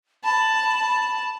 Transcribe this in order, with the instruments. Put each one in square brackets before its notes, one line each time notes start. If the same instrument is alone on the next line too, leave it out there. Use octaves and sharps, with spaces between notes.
[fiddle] A5 [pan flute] B5